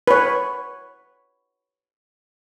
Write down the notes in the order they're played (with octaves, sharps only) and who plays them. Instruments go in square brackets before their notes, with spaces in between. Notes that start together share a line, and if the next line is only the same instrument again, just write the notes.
[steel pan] B4 C#5